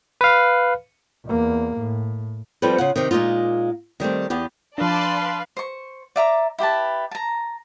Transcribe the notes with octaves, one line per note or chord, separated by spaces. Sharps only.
B4 F5
E2 A#3
A2
F3 G3 C4 F4 A4 B4
C#3 F4 F#5
C3 D#3
A#2 G#3 A#3 D#4 F4
D#3 G3 A3 C4
E2 B3 G4
F3 D4 B4 D5 F5 A5 C6
C5 C#6
D5 E5 A#5 D6
E4 G4 B4 A5
A5 A#5